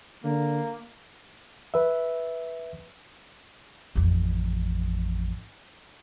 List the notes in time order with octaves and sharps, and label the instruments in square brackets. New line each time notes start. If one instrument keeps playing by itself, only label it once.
[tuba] D3 [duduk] A#3
[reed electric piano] B4 E5
[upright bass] A1 F2